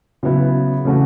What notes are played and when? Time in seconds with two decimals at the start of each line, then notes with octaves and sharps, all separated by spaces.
0.23 C#3 F#3 B3 E4
0.85 C#3 E3 A3 C#4 F#4